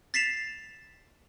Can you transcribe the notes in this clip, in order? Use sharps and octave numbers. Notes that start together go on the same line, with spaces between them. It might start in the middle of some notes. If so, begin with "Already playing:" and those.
A6 B6 C7 E7 F7